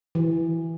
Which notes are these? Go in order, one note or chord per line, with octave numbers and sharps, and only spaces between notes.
E3